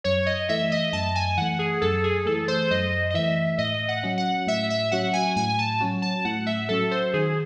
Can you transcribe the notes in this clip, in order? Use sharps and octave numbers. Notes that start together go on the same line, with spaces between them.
F#2 C#5
D#5
E3 A3 E5
D#5
F#2 A5
G#5
E3 A3 F#5
G#4
F#2 A4
G#4
E3 A3 A4
C5
F#2 D#5
D#5
E3 A3 E5
A2 D#5
F#5
F#3 C#4 F#4
F#5
A2 E5
E5
F#3 C#4 F#4 F#5
G#5
A2 G#5
A5
F#3 C#4 F#4
A5
A2 F#5
E5
F#3 C#4 F#4 A4
C5
D#3 G#4